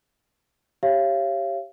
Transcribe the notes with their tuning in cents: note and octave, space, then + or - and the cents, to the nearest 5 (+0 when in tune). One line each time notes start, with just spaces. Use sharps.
G4 -5 C#5 -25 F5 -35